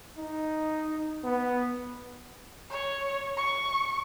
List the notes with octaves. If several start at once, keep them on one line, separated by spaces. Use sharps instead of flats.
D#4
B3
C#5
C#6